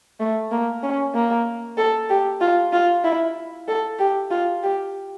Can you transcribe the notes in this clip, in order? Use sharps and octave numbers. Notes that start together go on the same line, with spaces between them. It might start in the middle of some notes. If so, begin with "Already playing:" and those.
A3
A#3
C#4
A#3
A4
G4
F4
F4
E4
A4
G4
F4
G4